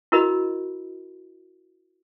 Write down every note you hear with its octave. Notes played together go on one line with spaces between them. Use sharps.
E4 F#4 A#4 D#5 B5